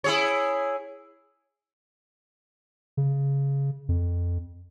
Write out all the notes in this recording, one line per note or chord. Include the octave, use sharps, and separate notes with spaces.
E4 G#4 C#5
C#3
F2